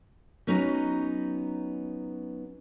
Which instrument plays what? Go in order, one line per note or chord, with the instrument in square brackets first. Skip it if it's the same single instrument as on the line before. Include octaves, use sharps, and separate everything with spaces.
[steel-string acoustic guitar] F#3 B3 C#4 D#4 A#5